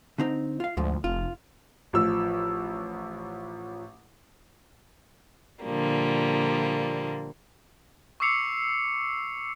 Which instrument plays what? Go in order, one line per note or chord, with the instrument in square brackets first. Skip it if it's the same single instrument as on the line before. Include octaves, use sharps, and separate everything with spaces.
[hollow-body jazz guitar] D3 C4 D#4
F4 F5
[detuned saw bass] D2 [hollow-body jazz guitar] G#2 F3
[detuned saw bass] F1 [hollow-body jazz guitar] F4
[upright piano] A1 F3 E6
[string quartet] A#2 D3 F3 G3 A#3
[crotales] C#6 D6 E6 C7 C#7 F7